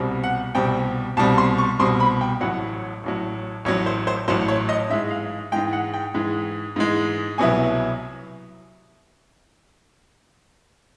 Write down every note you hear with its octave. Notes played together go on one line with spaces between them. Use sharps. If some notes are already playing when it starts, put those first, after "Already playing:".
Already playing: C2 B2 G3 C4
F#5
C2 B2 G3 C4 G5
C2 B2 G3 C4 A5
C6
C#6
C2 B2 G3 C4 C6
B5
G5
A1 A2 F#3 F#5
A1 A2 F#3
A1 A2 F#3 C#5
C5
C5
A1 A2 F#3 C5
C#5
D#5
G#2 E3 G#3 E5
F5
G#2 E3 G#3 G5
F#5
G5
G#2 E3 G#3
G#2 E3 G#3
C2 B2 F#3 B3 E4 G#5